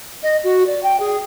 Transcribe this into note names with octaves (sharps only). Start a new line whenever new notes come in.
D#5
F#4
D5
G5
G#4